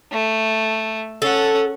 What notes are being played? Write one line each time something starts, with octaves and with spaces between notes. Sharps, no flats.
A3
C#4 A4 F#5